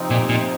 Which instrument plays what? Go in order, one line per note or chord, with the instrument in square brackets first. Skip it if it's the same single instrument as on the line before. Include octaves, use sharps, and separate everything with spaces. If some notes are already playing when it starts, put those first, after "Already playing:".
Already playing: [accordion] C3 F3 C4 D#4
[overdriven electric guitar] A#2
A#2